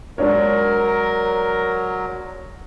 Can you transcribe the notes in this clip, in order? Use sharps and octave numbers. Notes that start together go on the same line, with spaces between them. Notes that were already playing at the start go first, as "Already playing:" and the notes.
F#3 G#3 D4 A#4 C#5